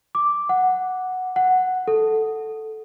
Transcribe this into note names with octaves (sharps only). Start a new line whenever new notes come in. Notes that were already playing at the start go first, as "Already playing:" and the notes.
D6
F#5
F#5
A4